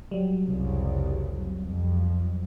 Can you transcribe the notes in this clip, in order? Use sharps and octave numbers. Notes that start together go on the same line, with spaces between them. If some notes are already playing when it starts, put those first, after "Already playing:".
F#3 G3
F1 C2 C#3
F2